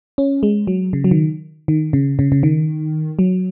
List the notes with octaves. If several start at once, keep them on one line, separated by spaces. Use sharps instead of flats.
C#4
G#3
F#3
C#3
F#3
D#3
D#3
C#3
C#3
C#3
D#3
F#3